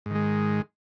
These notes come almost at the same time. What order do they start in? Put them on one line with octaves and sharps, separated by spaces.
G#2 D#3 G#3